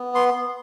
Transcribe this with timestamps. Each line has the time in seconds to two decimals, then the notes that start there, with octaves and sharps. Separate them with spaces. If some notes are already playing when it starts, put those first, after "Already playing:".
Already playing: B3
0.15 C6